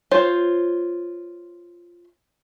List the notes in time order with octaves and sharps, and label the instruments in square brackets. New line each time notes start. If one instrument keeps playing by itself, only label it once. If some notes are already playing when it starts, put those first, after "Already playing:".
[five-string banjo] F4 C5 C#5